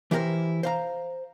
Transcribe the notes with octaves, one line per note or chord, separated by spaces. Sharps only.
E3 E4 G4 G#4 A#4 C5
C5 F5 A#5